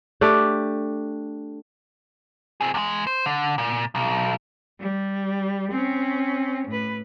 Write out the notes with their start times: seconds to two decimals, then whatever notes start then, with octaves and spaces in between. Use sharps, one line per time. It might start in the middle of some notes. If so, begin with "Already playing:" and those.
0.21 A3 D4 G4
2.61 C4 G#4
2.74 E2 G#3
3.07 C5
3.26 D3
3.58 A#2
3.95 B1
4.80 G3
5.71 C4 C#4
6.67 A2 B4